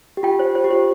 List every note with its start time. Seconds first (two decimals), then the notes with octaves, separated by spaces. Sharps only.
0.17 G4
0.23 F4 G5
0.39 C5
0.55 F4 C5
0.64 G4
0.70 F4 C5